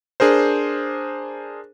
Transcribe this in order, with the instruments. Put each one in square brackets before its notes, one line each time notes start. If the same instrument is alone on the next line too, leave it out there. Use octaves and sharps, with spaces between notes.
[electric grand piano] D4 G#4 A#4 C5